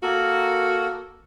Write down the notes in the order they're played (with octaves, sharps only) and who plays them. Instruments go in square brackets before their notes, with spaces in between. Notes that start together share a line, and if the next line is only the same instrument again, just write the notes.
[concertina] A#3 A4 A#4 [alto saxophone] F#4